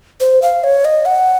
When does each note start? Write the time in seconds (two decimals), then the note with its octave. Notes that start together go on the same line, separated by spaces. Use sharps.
0.20 C5
0.42 F5
0.64 C#5
0.85 D#5
1.06 F#5